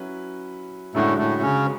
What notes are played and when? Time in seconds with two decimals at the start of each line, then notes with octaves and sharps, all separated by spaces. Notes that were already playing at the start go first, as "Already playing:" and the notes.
Already playing: F#3 C#4 E4 B4
0.94 F#2 A2 D3 G#3 A3 D4 F#4
1.18 A2 A3
1.41 C#3 C#4